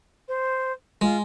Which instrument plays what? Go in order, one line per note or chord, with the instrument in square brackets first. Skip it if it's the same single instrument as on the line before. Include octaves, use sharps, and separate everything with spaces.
[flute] C5
[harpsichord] G#3 [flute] F4